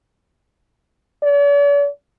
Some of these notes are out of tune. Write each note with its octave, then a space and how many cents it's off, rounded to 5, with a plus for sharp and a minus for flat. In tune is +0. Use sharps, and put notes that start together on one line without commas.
D5 -45